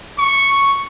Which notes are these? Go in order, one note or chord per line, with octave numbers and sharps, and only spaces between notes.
C#6